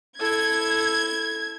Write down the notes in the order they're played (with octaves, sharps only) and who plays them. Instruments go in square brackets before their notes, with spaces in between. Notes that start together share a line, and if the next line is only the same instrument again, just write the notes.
[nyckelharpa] E4 A4 [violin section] G#6